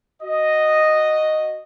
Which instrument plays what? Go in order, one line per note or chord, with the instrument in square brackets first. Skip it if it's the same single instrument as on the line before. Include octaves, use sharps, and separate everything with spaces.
[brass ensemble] F#4 D#5